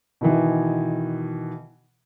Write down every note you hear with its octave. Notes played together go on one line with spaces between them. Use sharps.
B2 D#3 E3